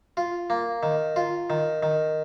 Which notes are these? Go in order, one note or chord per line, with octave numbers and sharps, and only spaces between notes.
F4
A#3
D#3
F4
D#3
D#3